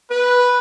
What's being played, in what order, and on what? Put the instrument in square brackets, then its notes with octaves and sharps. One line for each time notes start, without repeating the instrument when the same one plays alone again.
[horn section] B4